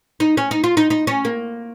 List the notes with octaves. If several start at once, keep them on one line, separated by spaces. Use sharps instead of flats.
D#4
C#4
D#4
F4
D#4
D#4
C#4
A#3